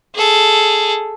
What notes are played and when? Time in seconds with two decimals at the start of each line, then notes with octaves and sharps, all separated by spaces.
0.15 G#4 A4